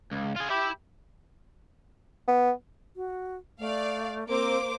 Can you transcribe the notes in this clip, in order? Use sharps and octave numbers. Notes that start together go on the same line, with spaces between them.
C#2
F4 G#4
G4 E5 B5
B3
F#4
A3 D5 F5
A#3 C4 C5 D6